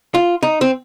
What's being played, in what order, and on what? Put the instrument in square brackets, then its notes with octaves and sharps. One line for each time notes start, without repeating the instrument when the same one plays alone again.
[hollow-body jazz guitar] F4
D#4
C4